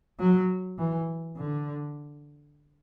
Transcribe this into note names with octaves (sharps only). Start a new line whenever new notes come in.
F#3
E3
D3